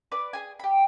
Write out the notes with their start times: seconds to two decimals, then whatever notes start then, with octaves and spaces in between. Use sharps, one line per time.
0.12 B4 D5 D6
0.33 G#4 G#5
0.59 G4 B5